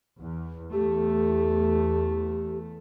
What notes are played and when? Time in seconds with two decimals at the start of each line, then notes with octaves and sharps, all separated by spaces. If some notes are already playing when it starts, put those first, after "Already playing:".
0.20 E2
0.73 E2 A3 G4